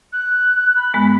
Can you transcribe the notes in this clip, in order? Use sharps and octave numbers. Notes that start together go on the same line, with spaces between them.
F#6
B5
G2 G#3 B3